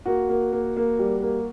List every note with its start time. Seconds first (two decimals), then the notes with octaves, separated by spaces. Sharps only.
0.06 A#3 F#4
0.29 A#3
0.53 A#3
0.77 A#3
0.99 G3
1.22 A#3